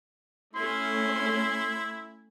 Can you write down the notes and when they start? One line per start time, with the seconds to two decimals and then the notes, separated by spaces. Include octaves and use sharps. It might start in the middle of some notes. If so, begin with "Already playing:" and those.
0.55 A3 C#4 E4 C6